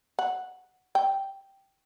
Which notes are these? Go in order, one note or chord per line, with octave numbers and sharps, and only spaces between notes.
F#5
G5